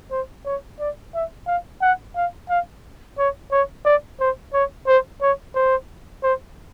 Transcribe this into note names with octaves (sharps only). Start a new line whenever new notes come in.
C5
C#5
D5
E5
F5
F#5
F5
F5
C#5
C#5
D5
C5
C#5
C5
C#5
C5
C5